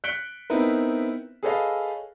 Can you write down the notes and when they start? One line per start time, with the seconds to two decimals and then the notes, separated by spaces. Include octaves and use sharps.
0.04 F#6 B6 C#7 D7 G7
0.50 B3 C4 D#4 E4 A#4 B4
1.43 G#4 A4 B4 C#5 D#5 F5